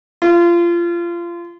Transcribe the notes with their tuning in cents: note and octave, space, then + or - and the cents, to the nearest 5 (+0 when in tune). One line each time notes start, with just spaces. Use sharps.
F4 -25